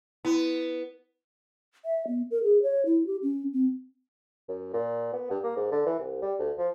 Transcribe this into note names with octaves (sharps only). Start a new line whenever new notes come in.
B3 E4
E5
B3
A#4
G#4
C#5
E4
G4
C#4
C4
F#2
A#2
B3
G2
A#3
G#2
D3
E3
C2
G3
D2
F3